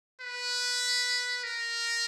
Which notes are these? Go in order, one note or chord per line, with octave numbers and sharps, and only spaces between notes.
B4
A#4